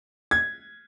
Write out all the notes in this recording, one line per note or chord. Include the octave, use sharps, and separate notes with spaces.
G#6